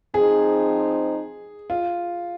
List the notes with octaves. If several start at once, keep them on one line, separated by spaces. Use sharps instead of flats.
F3 C4 D#4 G#4
F4